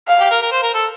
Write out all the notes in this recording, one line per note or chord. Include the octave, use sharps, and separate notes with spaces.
F5
G4
A#4
A#4
C5
A#4
A4